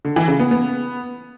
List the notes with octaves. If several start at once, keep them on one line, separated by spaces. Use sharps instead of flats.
D3
E3
C#3
B3
B3